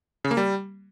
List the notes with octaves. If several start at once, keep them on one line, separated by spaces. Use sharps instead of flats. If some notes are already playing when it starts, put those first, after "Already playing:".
C#3
A#3
G3